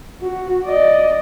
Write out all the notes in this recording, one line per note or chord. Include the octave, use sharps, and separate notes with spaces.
F#4
D5 D#5